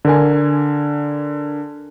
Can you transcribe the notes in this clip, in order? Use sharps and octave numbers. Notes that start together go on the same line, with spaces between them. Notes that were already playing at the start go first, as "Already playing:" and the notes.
D3 A#4 G#5